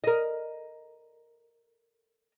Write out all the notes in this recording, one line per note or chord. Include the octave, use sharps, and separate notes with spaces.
A#4 D#5